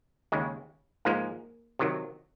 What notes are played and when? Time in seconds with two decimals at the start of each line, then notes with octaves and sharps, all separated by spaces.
0.32 D#2 C#3 G#3
1.05 G#2 F3 G#3 A#3
1.79 C3 D#3 F#3